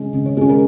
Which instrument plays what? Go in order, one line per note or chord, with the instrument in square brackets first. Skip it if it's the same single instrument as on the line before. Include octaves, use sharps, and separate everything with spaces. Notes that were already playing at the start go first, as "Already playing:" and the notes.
Already playing: [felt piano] C#3 G#3 C#4
C#3
C#5
G#3 G#4
C#4
A#4